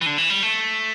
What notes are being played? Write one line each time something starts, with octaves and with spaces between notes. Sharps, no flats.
E3
D3
E3
G3
A3